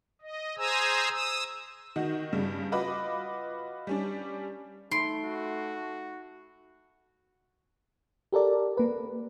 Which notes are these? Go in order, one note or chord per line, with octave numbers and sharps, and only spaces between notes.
D#5
G#4 C5 G#5 A#5 D#6 E6
D#6 E6
D#3 F#4 D#5
G2 C#3 G3
F4 F#4 B4 D#5 B5 D6
G3 C#4 D4
A3 D#4 B5 C6 D7
F#4
G4 A4 A#4 D5
A#3 B4